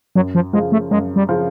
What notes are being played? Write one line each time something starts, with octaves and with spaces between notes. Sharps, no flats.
F#2 F#3
F3
C#3 F3 G#3
A3
F#2 G#3
G3
C#3 F3